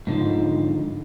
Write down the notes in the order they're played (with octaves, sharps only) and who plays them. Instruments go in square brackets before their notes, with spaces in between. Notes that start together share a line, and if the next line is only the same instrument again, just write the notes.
[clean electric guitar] G#2 D3 E3 F3